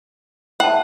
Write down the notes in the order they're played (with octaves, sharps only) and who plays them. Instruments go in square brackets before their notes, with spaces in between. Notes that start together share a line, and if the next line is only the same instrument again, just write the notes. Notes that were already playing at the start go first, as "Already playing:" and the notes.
[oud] G#4 E5 [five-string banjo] F#5 [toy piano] G5 A5